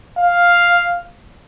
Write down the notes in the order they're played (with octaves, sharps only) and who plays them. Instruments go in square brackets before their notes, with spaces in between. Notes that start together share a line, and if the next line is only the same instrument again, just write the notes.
[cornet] F5